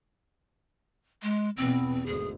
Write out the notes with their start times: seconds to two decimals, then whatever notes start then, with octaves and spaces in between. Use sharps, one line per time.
1.23 G#3
1.57 E2 B2 B3 C4
2.06 G#1 D2 G#4